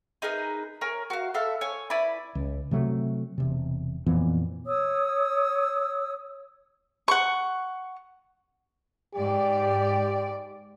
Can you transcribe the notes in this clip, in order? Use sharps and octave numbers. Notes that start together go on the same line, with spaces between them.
D#4 G#4 A#4 B4
A#4 C#5 G#5
F#4 F5
A4 E5 F5 B5
C#5 G#5
E4 B4 D5 B5
C#2
C3 F#3 A3
E1 C3
F2 A#2 E3 B3
C#5 D#6 E6
F#5 C#6
G#2 G4 D5